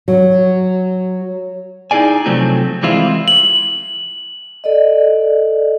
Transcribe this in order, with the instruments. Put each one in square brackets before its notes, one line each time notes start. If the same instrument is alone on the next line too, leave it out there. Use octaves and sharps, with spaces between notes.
[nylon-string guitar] F#3
[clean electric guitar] D#4 E4 G#4 D5 G#5
C3 F3 F#3 A3 C4
E3 G3 G#3 C4 E4 F4
[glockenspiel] F#7
[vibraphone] A4 D5 D#5